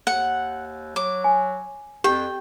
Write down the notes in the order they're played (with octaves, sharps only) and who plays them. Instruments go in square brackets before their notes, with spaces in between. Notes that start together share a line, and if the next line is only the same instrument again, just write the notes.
[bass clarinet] D#2 [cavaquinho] F#5
[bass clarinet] F#3 [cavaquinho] D6
[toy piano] G#5
[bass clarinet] F2 [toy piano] G4 [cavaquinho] G5